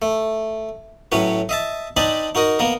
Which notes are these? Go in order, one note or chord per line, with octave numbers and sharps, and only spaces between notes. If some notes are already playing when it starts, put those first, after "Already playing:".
A3
A2 F#3 C#4 B4
D#5 E5 A5
C4 D4 D#4 D#5 A5 B5
D#4 F#4 A#4 D#5
A#3 B3 A#4